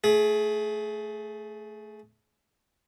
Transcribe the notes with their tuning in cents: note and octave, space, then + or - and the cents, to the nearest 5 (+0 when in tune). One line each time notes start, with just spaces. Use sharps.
A3 +0 G#4 +25